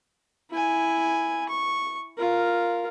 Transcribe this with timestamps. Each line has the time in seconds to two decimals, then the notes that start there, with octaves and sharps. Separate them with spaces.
0.51 E4 G#5
1.49 C#6
2.18 F4 A#4